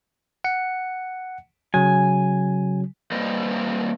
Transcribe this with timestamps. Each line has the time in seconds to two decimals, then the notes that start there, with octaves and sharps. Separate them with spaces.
0.44 F#5 C#7
1.74 C#3 F#3 G#5
3.12 G3 A#3 B4 C5 D#5